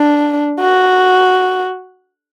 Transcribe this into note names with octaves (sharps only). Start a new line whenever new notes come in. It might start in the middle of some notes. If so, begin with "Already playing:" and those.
Already playing: D4
F#4